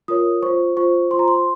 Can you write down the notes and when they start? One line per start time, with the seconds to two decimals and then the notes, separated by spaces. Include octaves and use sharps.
0.08 F4 A#4 C#5 D#6
0.43 F4 C5 C#6
0.77 F4 C5 C#6
1.11 F4 C5 C6
1.19 A#5
1.28 C6